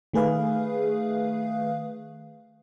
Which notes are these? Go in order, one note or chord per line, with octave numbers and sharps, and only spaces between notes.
D#3 A3 G#4 B4 F5